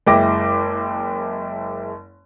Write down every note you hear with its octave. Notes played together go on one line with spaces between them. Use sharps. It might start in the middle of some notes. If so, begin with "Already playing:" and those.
F#1 G#3 E4 G5 D6 A#6